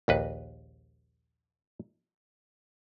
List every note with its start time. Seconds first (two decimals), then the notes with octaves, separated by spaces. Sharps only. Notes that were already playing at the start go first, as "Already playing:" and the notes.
0.08 A#1 D#2 B4